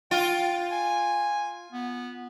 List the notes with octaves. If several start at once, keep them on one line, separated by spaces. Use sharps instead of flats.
F4 G5
G#5
B3